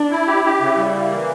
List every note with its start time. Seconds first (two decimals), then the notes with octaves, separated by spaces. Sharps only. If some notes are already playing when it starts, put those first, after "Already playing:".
Already playing: D4
0.11 E4
0.27 G4
0.45 G4
0.61 C#3 E4
0.77 G3
0.94 A#3
1.11 E3